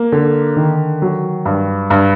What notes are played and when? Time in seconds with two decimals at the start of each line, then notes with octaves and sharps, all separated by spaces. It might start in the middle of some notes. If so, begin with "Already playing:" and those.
Already playing: A#3
0.12 D3
0.56 D#3
1.02 F#3
1.45 G2
1.90 G2